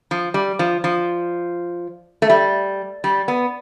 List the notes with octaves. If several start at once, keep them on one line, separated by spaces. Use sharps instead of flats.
F3
G3
F3
F3
A3
G3
G3
B3